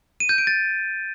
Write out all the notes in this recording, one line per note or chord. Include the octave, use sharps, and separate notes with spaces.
D#7
G6
D7
A6